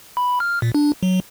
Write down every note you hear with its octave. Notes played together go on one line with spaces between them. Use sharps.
B5
F6
A#2
D4
F#3